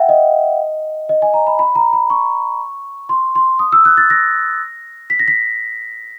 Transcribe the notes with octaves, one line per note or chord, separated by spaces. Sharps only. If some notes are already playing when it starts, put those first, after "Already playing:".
Already playing: E5 F#5 G5
D#5
D#5
G#5
A#5
B5
B5
A#5
B5
C#6
C6
C6
D#6
E6
F#6
A6
A#6
B6
A#6
B6